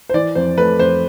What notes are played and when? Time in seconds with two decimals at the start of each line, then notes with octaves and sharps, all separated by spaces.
0.09 C5
0.14 E3 D5
0.35 F2 C5
0.57 A3 B4
0.79 F2 C5